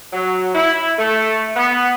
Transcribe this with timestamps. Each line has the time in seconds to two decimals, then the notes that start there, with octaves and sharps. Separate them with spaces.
0.13 F#3
0.54 E4
0.98 A3
1.56 B3